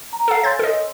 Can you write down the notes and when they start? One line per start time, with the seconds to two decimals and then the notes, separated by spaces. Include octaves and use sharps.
0.13 A#5
0.28 A4 F5
0.43 C#5 G#5 C6 G6 A6
0.59 A4 D#5